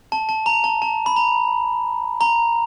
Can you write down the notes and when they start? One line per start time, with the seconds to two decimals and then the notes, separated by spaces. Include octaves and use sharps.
0.12 A5
0.29 A5
0.46 A#5
0.64 A5
0.82 A5
1.06 B5
1.16 A#5
2.21 A#5